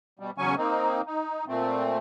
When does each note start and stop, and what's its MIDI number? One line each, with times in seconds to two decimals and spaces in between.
0.19 0.31 47
0.19 0.31 55
0.38 0.55 40
0.38 0.55 49
0.38 0.55 54
0.38 0.55 61
0.38 0.55 80
0.38 0.55 85
0.57 1.01 58
0.57 1.01 60
0.57 1.01 63
1.07 1.45 63
1.48 1.98 46
1.48 1.98 57
1.48 1.98 60